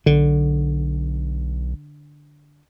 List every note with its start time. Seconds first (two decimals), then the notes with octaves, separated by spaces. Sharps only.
0.06 B1 D3